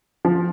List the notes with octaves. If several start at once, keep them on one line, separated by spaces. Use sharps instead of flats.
F3